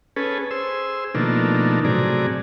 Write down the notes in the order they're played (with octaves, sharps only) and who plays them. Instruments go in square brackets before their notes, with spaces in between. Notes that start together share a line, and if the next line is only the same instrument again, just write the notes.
[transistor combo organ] C#4 G#4 A4 B4
G#4 C5 E6
B2 D#3 F3 A3 A#3 D4
A2 C3 F#3 G#4 D5 A#5